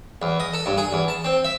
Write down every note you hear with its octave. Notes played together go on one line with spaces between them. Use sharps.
E2
D#5
A4
G2
G#4
E2
A5
C4
E5